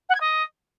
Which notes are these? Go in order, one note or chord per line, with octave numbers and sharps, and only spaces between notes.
F#5
G#6
D#5